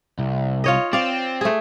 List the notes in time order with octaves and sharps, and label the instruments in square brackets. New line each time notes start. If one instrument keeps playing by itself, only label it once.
[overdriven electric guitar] C2
[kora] F4 C#5 D#5
[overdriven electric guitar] C4 [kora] D5 F5
[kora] A3 G#4